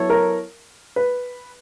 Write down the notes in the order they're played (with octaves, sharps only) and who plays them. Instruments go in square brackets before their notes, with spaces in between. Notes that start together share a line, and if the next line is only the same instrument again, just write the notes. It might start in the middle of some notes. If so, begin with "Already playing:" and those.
Already playing: [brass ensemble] F#3 B3 E4 A4 C#5
[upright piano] A#4
B4